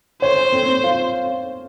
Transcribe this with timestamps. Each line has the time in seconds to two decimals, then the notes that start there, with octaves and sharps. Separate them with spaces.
0.21 C5 C#5
0.53 C4
0.84 F4